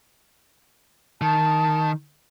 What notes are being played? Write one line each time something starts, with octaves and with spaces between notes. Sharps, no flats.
D#3 A5